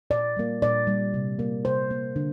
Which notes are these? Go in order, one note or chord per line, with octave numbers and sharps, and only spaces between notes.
A#2 D5
G3 A#3
A#2 D5
G3 A#3
C3
A#3
C3 C5
A#3
D3